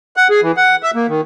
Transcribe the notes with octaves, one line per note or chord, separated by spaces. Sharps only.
F#5
G#4
E3
F#5
E5
A#3
D#3